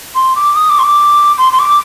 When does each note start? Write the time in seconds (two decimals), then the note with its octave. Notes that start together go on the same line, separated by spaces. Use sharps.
0.15 C6
0.36 D6
0.56 D#6
0.70 D6
0.79 C6
0.83 D6
1.38 C6
1.53 C6
1.59 D6